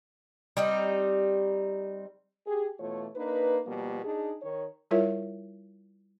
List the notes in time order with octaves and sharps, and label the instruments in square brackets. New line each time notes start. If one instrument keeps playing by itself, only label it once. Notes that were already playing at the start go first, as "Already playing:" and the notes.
[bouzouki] G3 C4 D#4
[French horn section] G4 G#4
B2 E3 A3 F4 C#5
A#3 D4 D#4 B4
B2 F3 G3 A#3
D4 D#4 G#4
D#3 C#5
[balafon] G3 E4 F4 A#4 C#5 E5